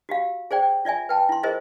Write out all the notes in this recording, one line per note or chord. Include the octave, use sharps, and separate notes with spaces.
F#4 G4 F5
G#4 C5 D5 G5
F4 D5 E5 G#5
B4 G5 A5 B5
E4 C6
F4 G#4 A#4 C5 D#5